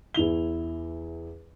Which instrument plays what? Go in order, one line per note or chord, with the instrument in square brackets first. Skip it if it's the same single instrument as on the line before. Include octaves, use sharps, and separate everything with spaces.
[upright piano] E2 E4 F7 G7